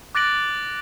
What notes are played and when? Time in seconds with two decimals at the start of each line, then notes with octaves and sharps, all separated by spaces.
0.15 D6 F#6 A6 A#6 D7 F#7